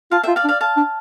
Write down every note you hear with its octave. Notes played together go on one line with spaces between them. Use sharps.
F4 F5 A5
F4 E5 G5
D5 F5
D4
D5 F5
F5 A5
D4